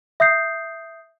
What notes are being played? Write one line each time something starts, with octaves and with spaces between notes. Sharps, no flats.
E5 D#6 G6 C7